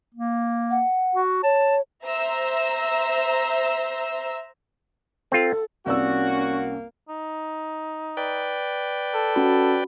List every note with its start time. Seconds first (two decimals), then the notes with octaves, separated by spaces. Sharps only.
0.15 A#3
0.71 F#5
1.15 F#4
1.43 C#5 A5
2.04 C5 E5 A#5 E6
5.32 C4 F4 A4
5.86 C2 A#3 C#4 F#4 D5 E6
7.09 D#4
8.17 B4 D5 G5
9.14 A4
9.35 C#4 F#4 B5